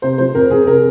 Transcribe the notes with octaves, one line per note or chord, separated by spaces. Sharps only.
C3 C5
F3 C5
F2 A#4
F2 G#4
C3 A#4